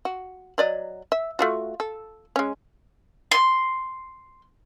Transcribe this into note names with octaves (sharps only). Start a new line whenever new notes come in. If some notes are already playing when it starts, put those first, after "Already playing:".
F#4
F#3 D5 D#5
E5
A3 F4 F#4
A4
G#3 C#4
C6